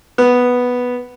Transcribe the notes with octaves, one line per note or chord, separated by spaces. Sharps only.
B3